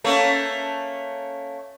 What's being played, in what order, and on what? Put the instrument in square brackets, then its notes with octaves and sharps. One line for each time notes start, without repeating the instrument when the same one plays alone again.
[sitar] A3 A#3 C#4